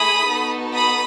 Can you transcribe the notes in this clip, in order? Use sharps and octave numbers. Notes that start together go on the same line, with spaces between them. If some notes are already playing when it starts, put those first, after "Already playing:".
Already playing: A3 E4 G#4 B5 D#6
B3 D#4 F#4 A4
B5 D#6